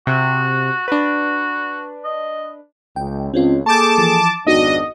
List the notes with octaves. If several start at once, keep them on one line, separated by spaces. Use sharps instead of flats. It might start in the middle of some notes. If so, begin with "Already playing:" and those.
C3 F#4
D4 F#4 B4
D#5
C#2 G5
C#2 C4 C#4 F4
A#3 G#4 A4 A5 C#6 D6 G6
E3 F3
G#1 F2 B3 D4 D#4 F#4 D#5